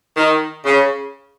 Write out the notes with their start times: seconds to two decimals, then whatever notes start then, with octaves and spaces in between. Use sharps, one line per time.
0.17 D#3
0.65 C#3